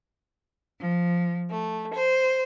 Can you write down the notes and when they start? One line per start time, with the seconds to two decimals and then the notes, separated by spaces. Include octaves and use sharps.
0.80 F3
1.50 A3
1.93 C5